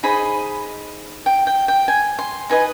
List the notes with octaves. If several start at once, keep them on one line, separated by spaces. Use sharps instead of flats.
D#4 G#4 C5 D#5 B5
G5
G5
G5
G#5
C6
D#4 B4 D#5 G#5